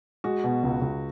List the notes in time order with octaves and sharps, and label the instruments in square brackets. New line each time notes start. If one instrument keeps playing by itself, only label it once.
[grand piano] G#3 [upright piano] F#4
[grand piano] B2
C#2
C#2